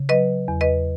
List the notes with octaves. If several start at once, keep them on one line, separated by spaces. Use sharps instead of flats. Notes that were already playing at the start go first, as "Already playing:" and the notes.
Already playing: C#3
F#3 B4 D#5
E2
B4 D#5